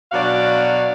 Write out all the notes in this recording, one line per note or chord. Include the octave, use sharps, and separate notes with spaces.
B2 F#3 D4 F#4 D5 F5